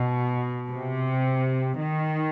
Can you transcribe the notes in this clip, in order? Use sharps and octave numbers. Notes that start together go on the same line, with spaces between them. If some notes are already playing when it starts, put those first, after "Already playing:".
Already playing: B2
C3
D#3